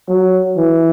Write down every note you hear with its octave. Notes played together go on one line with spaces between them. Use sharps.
F#3
E3